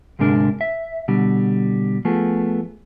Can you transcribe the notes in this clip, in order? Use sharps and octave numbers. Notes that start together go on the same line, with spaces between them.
D2 G#2 C3 G#3 D4 A#4
E5
B2 D3 G3
F3 A3 B3 G#4